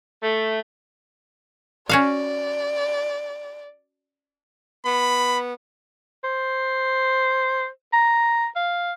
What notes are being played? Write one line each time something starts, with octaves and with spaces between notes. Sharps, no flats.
A3
C#4 F#4 D5 F5
B3 B5
C5
A#5
F5